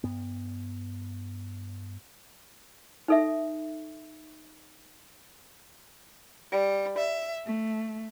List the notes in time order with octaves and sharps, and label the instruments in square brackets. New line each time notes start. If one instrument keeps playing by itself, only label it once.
[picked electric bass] G2 B3
[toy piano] D#4 A4 E5
[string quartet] G3
E5
A3